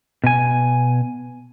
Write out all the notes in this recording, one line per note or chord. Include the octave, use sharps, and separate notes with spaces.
B2 G#5